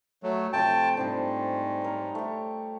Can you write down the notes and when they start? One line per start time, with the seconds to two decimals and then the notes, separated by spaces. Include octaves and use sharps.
0.23 F#3 A3
0.53 C3 F3 A3 G5 A5
0.97 G#2 G3 C4 D4
1.82 A#4 C#5
2.15 A3 G4